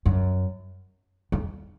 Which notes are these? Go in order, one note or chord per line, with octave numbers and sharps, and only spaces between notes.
F#2
F2